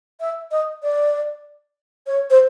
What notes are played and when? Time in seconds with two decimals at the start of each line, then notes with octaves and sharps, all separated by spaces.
0.20 E5
0.51 D#5
0.83 D5
2.07 C#5
2.30 C5